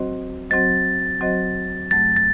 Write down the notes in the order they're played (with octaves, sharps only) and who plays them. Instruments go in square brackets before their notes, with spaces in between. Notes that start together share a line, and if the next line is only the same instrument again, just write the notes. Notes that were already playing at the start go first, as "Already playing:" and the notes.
Already playing: [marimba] F#3 C4 F#4 C5 D#5
[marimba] F#3 C4 F#4 C5 D#5 [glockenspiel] A6
[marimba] F#3 C4 F#4 C5 D#5
[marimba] G2 F#3 A3 [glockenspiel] A6
[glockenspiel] A6